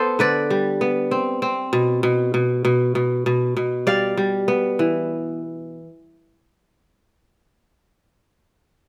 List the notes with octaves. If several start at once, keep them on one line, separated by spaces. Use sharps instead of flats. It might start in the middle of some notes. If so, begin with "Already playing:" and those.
Already playing: B3 A4 C5
D3 B4 D5
G3
B3
C4
C4
B2
B2
B2
B2
B2
B2
B2
G3 D5 F5
G3
B3
E3